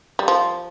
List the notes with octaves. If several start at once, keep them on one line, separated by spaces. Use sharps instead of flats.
G3
F3